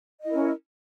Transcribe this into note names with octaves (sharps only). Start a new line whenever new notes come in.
C#4 E4 A#4 D#5